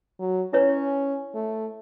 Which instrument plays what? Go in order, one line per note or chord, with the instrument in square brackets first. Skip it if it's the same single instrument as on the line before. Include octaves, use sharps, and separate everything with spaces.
[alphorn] F#3
[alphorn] C#4 [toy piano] E4 B4 C#5
[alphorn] A3